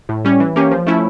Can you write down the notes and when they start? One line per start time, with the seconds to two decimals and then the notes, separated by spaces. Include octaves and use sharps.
0.09 A2
0.25 G3 C#4
0.40 E3
0.56 A#3 C#4 G4
0.71 F3
0.87 A3 C#4 E4